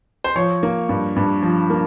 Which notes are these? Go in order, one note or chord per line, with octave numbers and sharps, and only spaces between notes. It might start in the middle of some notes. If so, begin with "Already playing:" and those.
C5
F3 C#5
A#3
G2
G2
F3
A#3